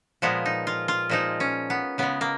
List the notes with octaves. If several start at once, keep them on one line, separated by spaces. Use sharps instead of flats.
A#2 F3 G#3 B3
D#4
F4
F4
A#2 F3 G#3 D#4
C#4
B3
C#3 G#3 B3
A#3